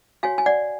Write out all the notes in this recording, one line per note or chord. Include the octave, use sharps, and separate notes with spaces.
F#4 C#5 F5 G#5
G#5
D5 F#5